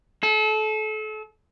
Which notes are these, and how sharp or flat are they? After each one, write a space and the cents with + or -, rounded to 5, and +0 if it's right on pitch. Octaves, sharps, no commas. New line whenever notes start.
A4 -30